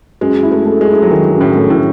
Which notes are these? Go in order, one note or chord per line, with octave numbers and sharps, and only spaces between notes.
F#2 G#3
E4
A3
A3
G#3
E4
F#3
D#3 G#3
F#2
A2
A3
A2